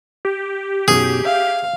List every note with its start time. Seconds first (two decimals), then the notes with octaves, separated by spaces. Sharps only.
0.25 G4
0.88 B1 F#2 F#4 G#4
1.25 E5 F5